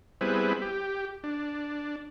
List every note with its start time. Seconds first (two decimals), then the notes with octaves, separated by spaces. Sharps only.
0.21 G3 B3 C4 E4 G#4 B4
0.62 G4
1.24 D4